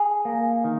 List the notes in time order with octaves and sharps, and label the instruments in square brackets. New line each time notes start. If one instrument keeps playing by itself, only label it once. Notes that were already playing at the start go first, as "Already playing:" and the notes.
Already playing: [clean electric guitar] G#4
A#3
D#3